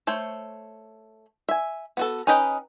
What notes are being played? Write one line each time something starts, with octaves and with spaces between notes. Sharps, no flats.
A3 C5 C#5
E5 G#5
B3 F#4 A4
C#4 D#4 B4 D#5 G5